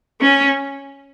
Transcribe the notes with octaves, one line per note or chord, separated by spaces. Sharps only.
C#4